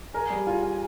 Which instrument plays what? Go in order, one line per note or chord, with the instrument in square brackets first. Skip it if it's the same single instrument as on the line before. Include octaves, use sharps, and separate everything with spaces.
[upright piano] A#4 [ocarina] G#5
[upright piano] G3
F4
F4